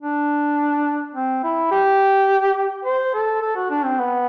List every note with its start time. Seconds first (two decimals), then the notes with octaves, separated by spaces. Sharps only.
0.01 D4
1.15 C4
1.44 E4
1.71 G4
2.85 C5
3.14 A4
3.41 A4
3.56 F#4
3.70 D4
3.85 C4
3.99 B3